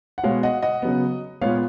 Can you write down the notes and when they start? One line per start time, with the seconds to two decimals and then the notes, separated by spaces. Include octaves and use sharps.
0.18 F#5
0.24 B2 G#3 B3 C#5 F5
0.43 D#5 F#5
0.62 D#5 F#5
0.82 C#3 F#3 B3
1.41 A#2 G#3 B3 C#5 F5